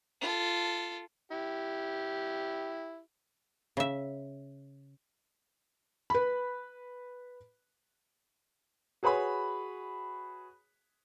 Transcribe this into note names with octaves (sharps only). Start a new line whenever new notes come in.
F4 A4
E4 G4
C#3 E5
B4 B5
F#4 G#4 B4 C#5 B5